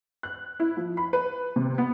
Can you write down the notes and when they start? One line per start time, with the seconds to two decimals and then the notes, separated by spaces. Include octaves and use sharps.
0.23 F#6
0.60 E4
0.77 F3
0.97 B5
1.13 B4
1.56 C3
1.78 B3